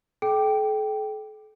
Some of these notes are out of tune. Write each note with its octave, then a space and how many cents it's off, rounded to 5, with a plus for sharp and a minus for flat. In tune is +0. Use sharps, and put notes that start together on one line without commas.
A4 -45 G5 -5